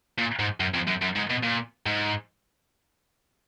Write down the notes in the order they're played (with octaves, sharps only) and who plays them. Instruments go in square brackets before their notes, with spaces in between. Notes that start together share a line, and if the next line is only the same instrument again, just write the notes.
[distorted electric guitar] A#2
G#2
F#2
F2
F#2
F#2
G#2
B2
A#2
G#2